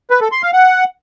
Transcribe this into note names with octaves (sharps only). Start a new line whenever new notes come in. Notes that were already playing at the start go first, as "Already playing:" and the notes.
B4
A4
C6
F5
F#5